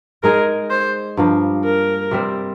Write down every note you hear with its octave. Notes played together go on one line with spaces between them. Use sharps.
G#3 D#4 G#4 A#4
C5
G2 F3 A#3
A#4
C3 G3 C4